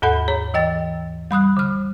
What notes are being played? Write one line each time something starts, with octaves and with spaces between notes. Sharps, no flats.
D#2 G#2 A4 F#5 B5
G#4 C#5 A#5
E3 D#5 G5 A6
G3 B5 D#6 F#6
D3 F6